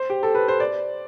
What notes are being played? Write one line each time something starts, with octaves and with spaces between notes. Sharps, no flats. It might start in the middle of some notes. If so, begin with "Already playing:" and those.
Already playing: C5
G4
A4
B4
C5
D5